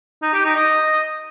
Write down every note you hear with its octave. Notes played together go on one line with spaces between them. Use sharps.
D#4
G4
D#4
D#5